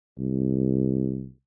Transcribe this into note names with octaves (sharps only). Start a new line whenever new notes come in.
C2